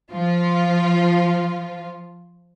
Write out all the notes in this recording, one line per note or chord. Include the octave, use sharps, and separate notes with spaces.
F3 F4